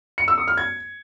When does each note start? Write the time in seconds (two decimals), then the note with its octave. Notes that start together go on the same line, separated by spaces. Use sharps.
0.18 C#7
0.28 E6
0.38 D#6
0.48 F6
0.57 G#6